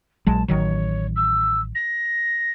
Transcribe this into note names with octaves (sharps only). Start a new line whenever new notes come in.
A#1 F#3 G#3 A5
A1 D#3 F#3 C#5
E6
A#6